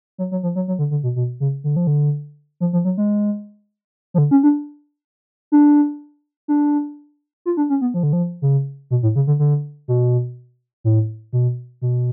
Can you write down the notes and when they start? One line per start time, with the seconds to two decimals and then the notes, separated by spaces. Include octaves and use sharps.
0.18 F#3
0.31 F#3
0.43 F3
0.56 F#3
0.68 F#3
0.79 D3
0.91 D3
1.03 B2
1.16 B2
1.40 C#3
1.64 D3
1.76 F3
1.87 D3
2.60 F3
2.73 F3
2.85 F#3
2.98 G#3
4.14 F3
4.18 D3
4.31 C#4
4.43 D4
5.52 D4
6.48 D4
7.46 F4
7.57 D4
7.70 C#4
7.81 B3
7.94 F3
8.03 D3
8.13 F3
8.42 C#3
8.91 B2
9.03 A2
9.16 C#3
9.27 D3
9.39 D3
9.88 B2
10.84 A2
11.33 B2
11.82 B2